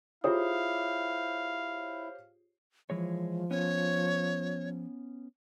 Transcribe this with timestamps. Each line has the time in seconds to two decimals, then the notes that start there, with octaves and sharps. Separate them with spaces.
0.24 E4 F4 G4 G#4 C5 C#5 F5 D#6
2.90 E3 F3 G#3 C#5
3.51 B3 C#4 C#5